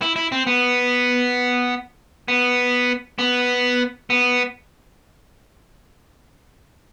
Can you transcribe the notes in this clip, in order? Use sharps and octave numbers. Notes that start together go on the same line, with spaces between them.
E4
E4
C4
B3
B3
B3
B3